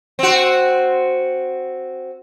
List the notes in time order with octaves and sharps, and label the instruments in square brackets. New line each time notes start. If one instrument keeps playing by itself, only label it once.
[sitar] C4 F#4